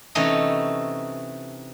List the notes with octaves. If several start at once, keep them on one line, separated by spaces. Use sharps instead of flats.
C3 E3 A3 C#4 D#4